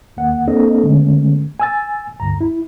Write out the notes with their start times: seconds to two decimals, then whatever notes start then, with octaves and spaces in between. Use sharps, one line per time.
0.17 D#2 A#3 F#5
0.48 A#3 C4 D4 A4 D#5
0.84 D3 G#3 A3 B3 C#4
1.60 G#5 E6 A6
2.20 D2 G2 A#5
2.41 E4